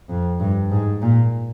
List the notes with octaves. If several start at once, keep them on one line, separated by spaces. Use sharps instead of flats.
F2
G2
G#2
A#2